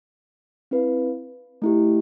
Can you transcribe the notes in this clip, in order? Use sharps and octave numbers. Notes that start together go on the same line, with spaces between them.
C4 E4 B4 F5
A3 E4 G4